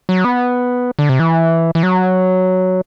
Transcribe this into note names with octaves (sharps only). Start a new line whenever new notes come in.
F#3
B3
D3
C3
E3
E3
F#3